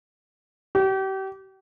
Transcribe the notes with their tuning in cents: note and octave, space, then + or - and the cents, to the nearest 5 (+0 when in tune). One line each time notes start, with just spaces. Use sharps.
G4 -35